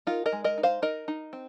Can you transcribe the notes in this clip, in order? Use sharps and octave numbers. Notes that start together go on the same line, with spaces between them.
D#4 F4 A#4
A#4 D#5
G#3
A#4 D#5
D#4
C5 F5
D#4 A#4 D#5
D#4
C4